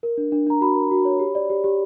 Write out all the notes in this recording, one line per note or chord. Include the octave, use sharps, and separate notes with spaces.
A#4
D4
D4
D4 A#5
F#4 B5
A#4
F#4
C#5
G4
D5
G4
G4